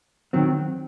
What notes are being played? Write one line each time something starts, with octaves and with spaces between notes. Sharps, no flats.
D#3 F#3 C4